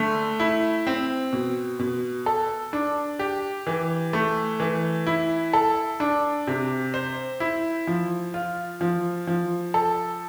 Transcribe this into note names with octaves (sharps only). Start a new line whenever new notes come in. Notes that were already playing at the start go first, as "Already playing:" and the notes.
Already playing: D3 A3
E4
C4
B2
B2
A4
D4
G4
E3
A3
E3
E4
A4
D4
C3
C5
E4
F3
F4
F3
F3
A4